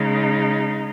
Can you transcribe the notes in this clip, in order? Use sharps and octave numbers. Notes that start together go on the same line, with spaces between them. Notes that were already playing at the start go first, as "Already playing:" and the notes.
Already playing: C#3 G#3 D#4